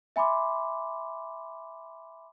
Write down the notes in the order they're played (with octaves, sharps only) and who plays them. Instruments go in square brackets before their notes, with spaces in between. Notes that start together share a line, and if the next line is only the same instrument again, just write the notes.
[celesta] E5 G#5 B5 C6 D6